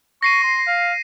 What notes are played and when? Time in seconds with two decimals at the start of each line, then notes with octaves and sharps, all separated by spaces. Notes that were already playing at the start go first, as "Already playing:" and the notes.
0.23 C#6 A#6 C7 D#7
0.43 C6
0.67 F5